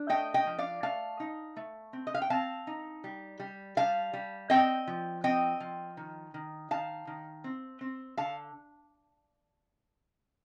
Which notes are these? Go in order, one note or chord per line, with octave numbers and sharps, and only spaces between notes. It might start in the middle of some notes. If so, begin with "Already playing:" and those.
Already playing: D4
A3 D#5 G5
D#5 G5
F3
D5 F5
A3 F5 A5
D#4
A3
C4
D#5
F5
G5
C4 F5 A5
D#4
G3
G3
G3 F5 A5
G3
C4 D#5 G5
F3
C4 D#5 G5
F3
D#3
D#3
D#3 F5 A5
D#3
C4
C4
D3 F5 A5